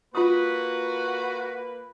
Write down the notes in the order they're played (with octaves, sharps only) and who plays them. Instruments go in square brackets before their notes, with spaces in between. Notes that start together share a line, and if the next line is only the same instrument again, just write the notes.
[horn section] A#3 B4 [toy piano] F4 D#6 [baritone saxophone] F#4